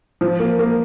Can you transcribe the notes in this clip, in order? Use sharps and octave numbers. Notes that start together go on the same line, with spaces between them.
F3
A#3
A#3